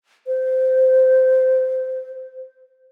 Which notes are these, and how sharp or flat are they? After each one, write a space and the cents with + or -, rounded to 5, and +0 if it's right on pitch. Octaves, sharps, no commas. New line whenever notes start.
C5 -15